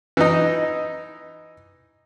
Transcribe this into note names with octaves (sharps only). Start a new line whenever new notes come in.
E3 D#4